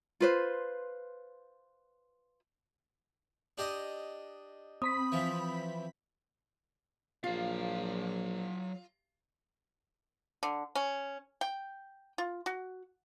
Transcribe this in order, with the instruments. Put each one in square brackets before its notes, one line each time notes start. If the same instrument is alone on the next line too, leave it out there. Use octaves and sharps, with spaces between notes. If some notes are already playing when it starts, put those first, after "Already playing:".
[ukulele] F4 B4 C5
[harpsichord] D4 G4 D#5
[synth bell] C4 B5 B6 [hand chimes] D#6
[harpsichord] E3 F3
[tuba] A#1 [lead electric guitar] F#3 F5 [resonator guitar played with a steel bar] F4
[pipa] D3
C#4
G5
F4
F#4